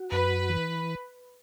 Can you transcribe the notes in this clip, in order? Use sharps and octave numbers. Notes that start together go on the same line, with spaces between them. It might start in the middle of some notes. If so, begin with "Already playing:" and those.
Already playing: F#4
F#2 B4
E3